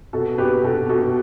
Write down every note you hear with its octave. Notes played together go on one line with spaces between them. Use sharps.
B2 A4
B2 G4 B4
B2 A4
B2 A4